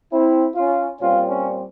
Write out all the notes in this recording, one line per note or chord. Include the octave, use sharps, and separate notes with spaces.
C4 E4
C#4 F4
A#2 G3 C4 C#4 F4
C#4